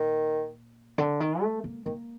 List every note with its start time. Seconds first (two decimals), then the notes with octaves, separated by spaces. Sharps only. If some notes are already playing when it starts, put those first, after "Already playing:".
Already playing: A#2 D#3
0.98 D3
1.20 D#3
1.42 A3
1.64 A#3
1.85 D#3 A#3